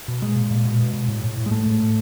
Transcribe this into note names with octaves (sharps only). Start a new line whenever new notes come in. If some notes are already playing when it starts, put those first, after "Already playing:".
B2
A#2 G#3
A#2
A#2
B2
B2
B2
A2
A2
A2
G#3
A2 A3
A2
A2